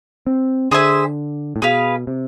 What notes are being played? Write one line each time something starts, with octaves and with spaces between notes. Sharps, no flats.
C4
D3 G#4 C5 E5 G#5
A2
B2 G#4 B4 F5
C3